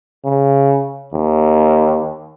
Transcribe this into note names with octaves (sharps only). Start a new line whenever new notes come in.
C#3
D#2